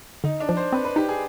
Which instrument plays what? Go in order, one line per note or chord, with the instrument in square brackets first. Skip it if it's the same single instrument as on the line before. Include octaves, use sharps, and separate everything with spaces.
[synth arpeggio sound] D3 [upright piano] D#4
[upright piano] D4
[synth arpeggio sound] F3
[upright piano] C5
[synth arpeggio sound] C4 [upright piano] B4
[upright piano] B4
[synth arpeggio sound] D#4 [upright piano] G4
[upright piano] G#4